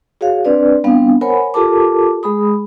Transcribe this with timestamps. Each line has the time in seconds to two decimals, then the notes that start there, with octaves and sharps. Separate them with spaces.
0.21 F#4 G#4 C#5 F5
0.45 C4 D4 B4 D5
0.84 G3 B3 C4 D4 F5
1.21 A#4 C5 C#5 F#5 G#5 B5
1.54 F4 G4 A4 A#4 A5 D6
2.23 G#3 G#4 B5 D#6